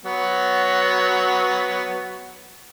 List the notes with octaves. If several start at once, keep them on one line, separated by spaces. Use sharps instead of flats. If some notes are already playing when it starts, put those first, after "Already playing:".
F#3 B3